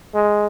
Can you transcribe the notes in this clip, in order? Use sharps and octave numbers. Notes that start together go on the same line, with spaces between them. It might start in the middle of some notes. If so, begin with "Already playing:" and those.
G#3